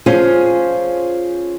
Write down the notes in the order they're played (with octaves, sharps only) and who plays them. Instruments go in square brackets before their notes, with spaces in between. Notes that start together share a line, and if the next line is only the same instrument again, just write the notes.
[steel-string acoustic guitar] F3 C#4 F4 G#4 C5